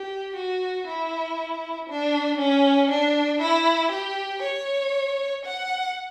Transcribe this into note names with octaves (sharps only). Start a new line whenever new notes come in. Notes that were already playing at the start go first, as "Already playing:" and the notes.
Already playing: G4
F#4
E4
D4
C#4
D4
E4
G4
C#5
F#5